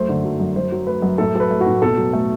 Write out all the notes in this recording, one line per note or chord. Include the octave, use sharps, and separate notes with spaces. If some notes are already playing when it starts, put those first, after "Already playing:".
Already playing: F#2 A3 C5
D3
F#3
F#2
F#2 C5
F#3
A3 B4
F#2
A2 A4
F#3 A4
B4
A3
F#4
A2
B2 A4
F#3
A3